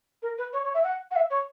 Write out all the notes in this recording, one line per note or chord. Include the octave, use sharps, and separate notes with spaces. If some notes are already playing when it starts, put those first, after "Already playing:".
A#4
B4
C#5
C#5
E5
F#5
F#5
E5
C#5